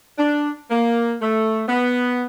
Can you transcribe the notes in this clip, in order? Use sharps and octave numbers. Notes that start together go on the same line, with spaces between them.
D4
A#3
A3
B3